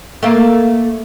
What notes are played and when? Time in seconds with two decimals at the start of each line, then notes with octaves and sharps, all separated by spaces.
0.23 A3 A#3